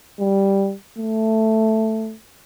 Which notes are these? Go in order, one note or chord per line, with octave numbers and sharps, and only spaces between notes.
G3
A3